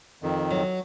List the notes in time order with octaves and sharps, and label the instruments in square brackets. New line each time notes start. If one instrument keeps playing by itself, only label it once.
[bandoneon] F2 D#3
[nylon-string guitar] F#3